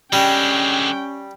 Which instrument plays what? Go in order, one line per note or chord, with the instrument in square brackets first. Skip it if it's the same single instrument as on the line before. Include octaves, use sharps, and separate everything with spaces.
[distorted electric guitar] D3 G#3 [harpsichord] G3 [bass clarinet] C#4 [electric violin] G5